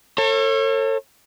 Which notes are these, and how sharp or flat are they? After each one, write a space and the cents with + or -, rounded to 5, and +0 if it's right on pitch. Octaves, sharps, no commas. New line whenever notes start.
A4 +35 C#5 -30